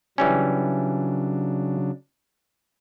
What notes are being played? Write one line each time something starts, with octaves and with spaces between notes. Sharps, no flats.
C#3 E3 F#3 G3 C#4 D4